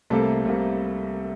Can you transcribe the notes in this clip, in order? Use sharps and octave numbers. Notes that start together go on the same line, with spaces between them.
C2 C3 G3 A3 A#3 A4
C2 C3 G3 A#3